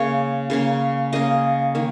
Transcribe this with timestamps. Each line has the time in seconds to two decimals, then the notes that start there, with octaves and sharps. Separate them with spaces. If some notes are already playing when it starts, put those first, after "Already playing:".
Already playing: C#3 A#3 C#4 A#4 C#5
0.50 C#3 A#3 C#4
1.12 C#3 A#3 C#4 D#5
1.75 D#3 A#3 C#4